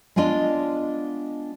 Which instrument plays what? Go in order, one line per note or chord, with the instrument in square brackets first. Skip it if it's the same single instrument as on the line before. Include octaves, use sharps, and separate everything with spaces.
[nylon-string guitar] G#3 B3 D4 F4 D5 D#5